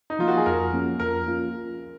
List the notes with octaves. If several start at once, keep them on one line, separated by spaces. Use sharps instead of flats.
D#4
F3 A#3 F4
F#4
G#4
F2 A#4
F3 A#3 C#4 F4
F2 A#4
F3 A#3 C#4 F4